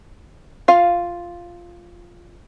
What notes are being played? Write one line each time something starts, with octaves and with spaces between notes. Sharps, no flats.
F4 F5